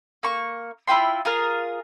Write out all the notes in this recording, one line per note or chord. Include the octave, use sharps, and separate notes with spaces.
A#3 C#6
E4 F4 G5 C6
F4 G#4 A#4 F6